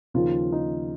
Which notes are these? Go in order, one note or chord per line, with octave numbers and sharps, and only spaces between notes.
D#2 C#3 F3 F4
D#4